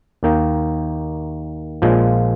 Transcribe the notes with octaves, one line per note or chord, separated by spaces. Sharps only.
D#2 D#3 A#3 D#4
A#1 A#2 F3 G#3